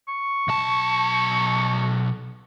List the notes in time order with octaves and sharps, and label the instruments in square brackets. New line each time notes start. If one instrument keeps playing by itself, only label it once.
[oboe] C#6
[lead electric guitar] B1 A5